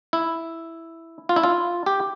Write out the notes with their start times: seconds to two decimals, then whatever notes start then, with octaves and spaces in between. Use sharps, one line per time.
0.13 E4
1.29 F4
1.36 E4
1.43 F4
1.86 G4